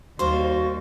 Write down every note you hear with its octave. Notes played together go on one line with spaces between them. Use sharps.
D#2 G3 F#4 C5 F5 C6